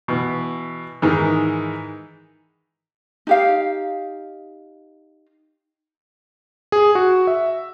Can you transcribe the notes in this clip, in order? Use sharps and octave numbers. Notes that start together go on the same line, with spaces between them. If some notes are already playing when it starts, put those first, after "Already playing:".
B2 E3
G#2 D#3 E3
D#4 G4 F5
G#4
F#4
E5